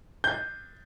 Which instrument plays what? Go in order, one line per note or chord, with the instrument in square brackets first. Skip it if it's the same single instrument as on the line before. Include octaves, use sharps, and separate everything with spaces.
[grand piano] G6